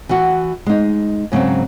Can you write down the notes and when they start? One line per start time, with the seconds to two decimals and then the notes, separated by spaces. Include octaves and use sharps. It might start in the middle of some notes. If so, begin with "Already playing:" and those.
0.09 E3 F#4
0.66 G#3 D#4
1.32 G#2 C#3 F#3 C4